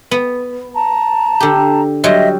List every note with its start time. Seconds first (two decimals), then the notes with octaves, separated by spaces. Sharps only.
0.11 B3
0.74 A5 A#5
1.40 D3 G4
2.04 F#3 G3 D#5 E5 C6